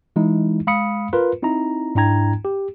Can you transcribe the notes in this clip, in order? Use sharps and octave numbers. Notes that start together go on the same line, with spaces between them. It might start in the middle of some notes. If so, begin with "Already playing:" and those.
E3 G#3 D#4 E4
G#3 F5 B5 D#6 C#7
F4 A#4 B4
C4 D#4 E4 A#5
G#2 D4 E4 G5 A#5 G#6
G4